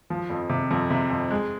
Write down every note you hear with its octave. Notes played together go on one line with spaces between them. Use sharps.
F3
F2
C3
F2
C3
F2
G#3